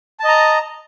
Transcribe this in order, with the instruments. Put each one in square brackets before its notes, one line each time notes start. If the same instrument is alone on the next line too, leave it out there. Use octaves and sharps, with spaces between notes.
[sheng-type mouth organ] A5
D#5
A#5